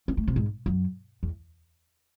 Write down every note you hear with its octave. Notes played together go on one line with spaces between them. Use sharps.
C#4
A3
C3
G#2
F#2
E2